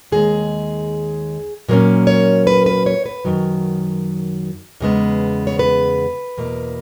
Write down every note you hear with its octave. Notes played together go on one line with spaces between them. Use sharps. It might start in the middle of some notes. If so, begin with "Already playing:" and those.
D#2 D#3 G#3 G#4
A#2 F#3 A#3 C#4
C#5
B4
B4
C#5
B4
F#2 D#3 F#3
E2 C#3 G#3 B3
C#5
B4
E2 B2 A#3